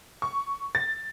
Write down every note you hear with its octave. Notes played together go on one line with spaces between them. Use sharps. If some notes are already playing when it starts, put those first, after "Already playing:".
C#6
A6